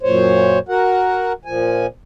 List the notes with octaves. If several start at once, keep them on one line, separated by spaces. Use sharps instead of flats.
F#2 A#2 C5 C#5
F#4 A#4 F#5
A#2 F3 G#5